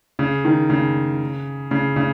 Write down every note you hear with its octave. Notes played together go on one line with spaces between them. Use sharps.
C#3
D#3
C#3
C#3
C#3